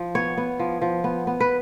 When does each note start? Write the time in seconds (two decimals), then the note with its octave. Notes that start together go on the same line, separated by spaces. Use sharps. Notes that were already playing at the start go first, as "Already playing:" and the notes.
Already playing: F3
0.15 B3 C#5
0.38 B3
0.59 F3
0.82 F3
1.04 B3
1.27 B3
1.40 B4